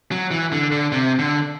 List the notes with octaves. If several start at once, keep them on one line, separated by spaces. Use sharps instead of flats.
F#3
E3
D3
D3
C3
D3